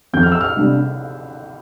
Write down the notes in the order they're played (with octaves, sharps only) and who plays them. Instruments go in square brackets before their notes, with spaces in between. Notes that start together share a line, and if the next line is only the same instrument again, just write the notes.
[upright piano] F2 [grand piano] G6
[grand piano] F6
E6
F6
[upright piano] C3 G3 D4